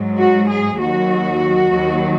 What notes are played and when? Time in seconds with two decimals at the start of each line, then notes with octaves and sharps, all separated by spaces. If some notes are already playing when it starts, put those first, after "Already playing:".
Already playing: G#2 F#3
0.17 F#4
0.48 G#4
0.79 D#2 D#3 F#3 F#4
1.71 D#2 D#3 F#3